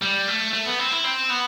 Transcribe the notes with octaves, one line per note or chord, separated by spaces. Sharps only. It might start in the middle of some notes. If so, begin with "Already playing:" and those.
G3
A3
A3
B3
C4
E4
C4
B3